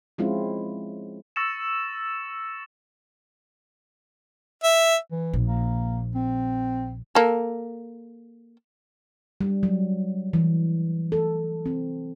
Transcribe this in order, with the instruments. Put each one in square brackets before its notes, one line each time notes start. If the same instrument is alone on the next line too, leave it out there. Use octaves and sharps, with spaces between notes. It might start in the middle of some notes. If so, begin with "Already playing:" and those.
[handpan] F3 G#3 C4 C#4 E4 F4
[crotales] C#6 E6 A6 A#6 C#7 E7
[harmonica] E5
[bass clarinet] E3
[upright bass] A#1
[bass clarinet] A#3
C4
[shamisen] A#3 A4
[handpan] G3
F#3
E3
A4
C4